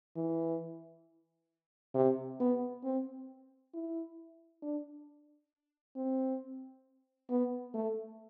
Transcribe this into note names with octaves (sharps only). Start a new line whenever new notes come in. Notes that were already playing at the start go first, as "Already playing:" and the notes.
E3
C3
B3
C4
E4
D4
C4
B3
A3